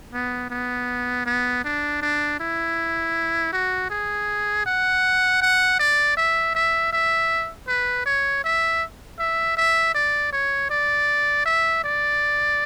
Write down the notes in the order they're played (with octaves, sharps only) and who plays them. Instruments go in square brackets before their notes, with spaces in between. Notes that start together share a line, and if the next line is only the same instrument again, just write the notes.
[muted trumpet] B3
B3
B3
D4
D4
E4
F#4
G#4
F#5
F#5
D5
E5
E5
E5
B4
C#5
E5
E5
E5
D5
C#5
D5
E5
D5